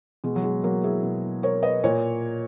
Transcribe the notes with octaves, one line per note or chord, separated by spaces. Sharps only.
B2 G#3
F#3
G#3
F#3 A#3
E4 G#4
B2
A#4 C#5
B4 D#5
A#2 A#4 C#5